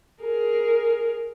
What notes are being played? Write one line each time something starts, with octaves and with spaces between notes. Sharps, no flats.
G#4 A#4